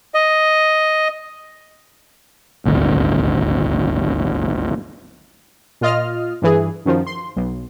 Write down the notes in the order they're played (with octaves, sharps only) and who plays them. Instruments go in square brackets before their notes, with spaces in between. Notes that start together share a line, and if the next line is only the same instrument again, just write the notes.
[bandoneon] D#5
[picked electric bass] D#1 G#1 D2
[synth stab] A#2 F4 D#5 F6
G2 E3 G#4
F#2 D#3 F3
C6
B1